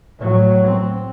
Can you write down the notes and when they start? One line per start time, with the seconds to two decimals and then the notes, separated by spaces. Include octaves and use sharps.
0.19 A2 F#3
0.68 C4